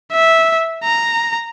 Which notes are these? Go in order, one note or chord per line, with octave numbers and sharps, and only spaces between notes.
E5
A#5